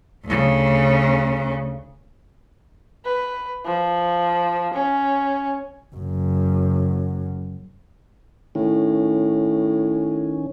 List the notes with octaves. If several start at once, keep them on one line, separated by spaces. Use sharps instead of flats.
D2 C#3
B4
F3
C#4
F#1 F#2
A2 D#3 C#4